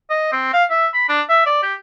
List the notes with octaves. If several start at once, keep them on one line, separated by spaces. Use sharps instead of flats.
D#5
C4
F5
E5
B5
D4
E5
D5
G4